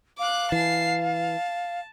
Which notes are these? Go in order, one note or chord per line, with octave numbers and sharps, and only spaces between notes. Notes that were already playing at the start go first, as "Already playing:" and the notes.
F5 D6 F#6
E3 A5 C7
A5